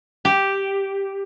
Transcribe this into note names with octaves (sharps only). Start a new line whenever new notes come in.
G4